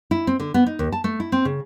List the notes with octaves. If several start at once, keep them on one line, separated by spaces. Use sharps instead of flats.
E4
C4
D3
B3
D#4
D#2
A5
A3
E4
C4
C#3